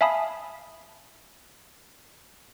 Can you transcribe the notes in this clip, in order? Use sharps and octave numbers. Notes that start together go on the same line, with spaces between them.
E5 F5 G#5 A5 B5 D#6